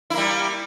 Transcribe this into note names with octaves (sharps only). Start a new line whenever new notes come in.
G3 A#3 E4